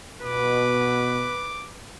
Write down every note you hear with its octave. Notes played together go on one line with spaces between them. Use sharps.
B2 B4 D6